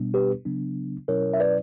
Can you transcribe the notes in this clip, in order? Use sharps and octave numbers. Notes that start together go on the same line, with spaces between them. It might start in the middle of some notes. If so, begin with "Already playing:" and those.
Already playing: B2 G3 B3 D4
G4 B4
C#3 F#3 B3 D4
B2 F#3 C#4 E4 A#4 C#5
E5
B4 D5